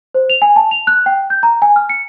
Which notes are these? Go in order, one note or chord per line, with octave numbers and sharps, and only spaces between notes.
C5
F7
G#5
A5
F7
F#6
G5
G6
A#5
G#5
F6
C#7